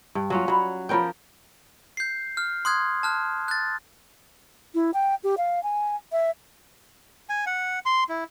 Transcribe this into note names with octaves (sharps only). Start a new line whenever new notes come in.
G2
F#3 A#3 C#4 F4
F#3 G3 B5
F3 B3 A#4 B4 C#5 G5
G6 C7
F6
C6 D#6 F#6 G#6
A5 F6 F#6
F#6 A6
E4
G5
G4
F5
G#5
E5
G#5
F#5
C6
E4